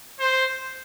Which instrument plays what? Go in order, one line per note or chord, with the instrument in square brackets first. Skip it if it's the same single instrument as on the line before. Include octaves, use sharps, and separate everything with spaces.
[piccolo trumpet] C5